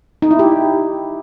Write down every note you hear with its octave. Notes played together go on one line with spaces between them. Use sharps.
D#4
E4
G4